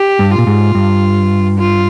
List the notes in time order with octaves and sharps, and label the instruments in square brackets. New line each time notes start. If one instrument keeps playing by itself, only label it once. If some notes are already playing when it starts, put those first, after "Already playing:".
Already playing: [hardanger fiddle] G4
[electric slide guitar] G2
[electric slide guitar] A#2 [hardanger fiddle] F4
[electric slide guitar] G#2
G2
[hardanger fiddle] F4